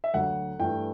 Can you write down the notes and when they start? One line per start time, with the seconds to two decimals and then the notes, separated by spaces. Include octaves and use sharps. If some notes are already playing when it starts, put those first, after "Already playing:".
0.04 E5
0.14 D2 D3 F#3 F#5
0.59 G2 E3 A3 G5